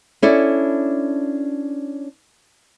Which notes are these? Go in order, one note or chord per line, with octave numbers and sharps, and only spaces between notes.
C#4 D4 E4 A4 D5